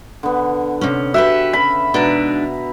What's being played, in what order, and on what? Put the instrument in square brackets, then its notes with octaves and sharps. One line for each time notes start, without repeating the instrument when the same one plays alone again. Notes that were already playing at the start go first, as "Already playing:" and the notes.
[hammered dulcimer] D3 B3
[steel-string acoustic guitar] C3 C#4
[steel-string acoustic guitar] F#4 G4 B4 [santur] E5
[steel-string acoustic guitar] C#3 [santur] B5
[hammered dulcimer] B2 A#5 [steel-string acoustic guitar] G#3 D4 D#4